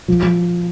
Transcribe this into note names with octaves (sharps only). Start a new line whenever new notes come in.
F3
F3